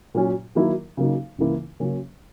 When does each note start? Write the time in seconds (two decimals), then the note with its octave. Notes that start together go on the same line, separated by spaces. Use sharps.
0.15 A#2 F#3 C#4
0.55 D#3 F#3 A#3 E4 A#4
0.97 C#3 F#3 A#3 D#4
1.38 C#2 C#3 E3 A#3 E4
1.80 C#3 F#3 A#3 C#4